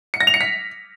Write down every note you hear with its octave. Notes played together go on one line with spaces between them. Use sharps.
C#7
A#6
F7
C#7
B6